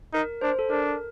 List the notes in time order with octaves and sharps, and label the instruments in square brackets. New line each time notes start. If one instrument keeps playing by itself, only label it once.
[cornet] D#4 [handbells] A#4
[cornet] D4 [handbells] C5
[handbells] A4
[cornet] D4 [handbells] A#4